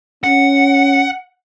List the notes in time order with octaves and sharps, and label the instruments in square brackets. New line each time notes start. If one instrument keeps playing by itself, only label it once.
[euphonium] C#4 [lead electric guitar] F#5